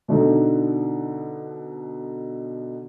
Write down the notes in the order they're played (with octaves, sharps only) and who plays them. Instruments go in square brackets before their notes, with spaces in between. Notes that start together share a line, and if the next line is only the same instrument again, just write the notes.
[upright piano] B2 D3 D#4 A4